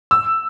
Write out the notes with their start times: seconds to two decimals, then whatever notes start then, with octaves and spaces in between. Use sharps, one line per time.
0.11 E6